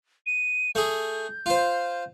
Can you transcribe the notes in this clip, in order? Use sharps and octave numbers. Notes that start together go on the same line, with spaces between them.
D#7
A3 G#4 G6
F4 C5